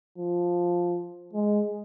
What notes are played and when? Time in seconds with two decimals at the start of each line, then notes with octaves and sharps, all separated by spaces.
0.18 F3
1.33 G#3